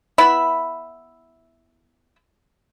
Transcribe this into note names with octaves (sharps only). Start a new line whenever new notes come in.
B3 E4 E5 B5